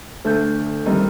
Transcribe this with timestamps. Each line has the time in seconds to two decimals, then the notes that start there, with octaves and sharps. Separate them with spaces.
0.24 D2 A4 G6
0.85 D#3 E3 G3 C4